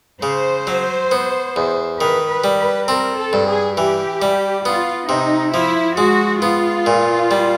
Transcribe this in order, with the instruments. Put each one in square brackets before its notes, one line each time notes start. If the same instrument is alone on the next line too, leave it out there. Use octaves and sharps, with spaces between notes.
[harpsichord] C#3 [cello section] C5
[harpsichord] F#3
B3
E2
[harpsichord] D#3 [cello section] B4
[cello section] B4
[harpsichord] G3
[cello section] B4
[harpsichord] C4 [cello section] A#4
[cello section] A4
[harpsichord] G2
[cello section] G#4
[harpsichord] E3 [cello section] G4
[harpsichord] G3
[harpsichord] B3 [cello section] F4
[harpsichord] C3 [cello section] D#4
[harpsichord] F3 [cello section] E4
[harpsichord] G#3 [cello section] F#4
[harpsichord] B3 [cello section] F4
[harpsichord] A#2
G3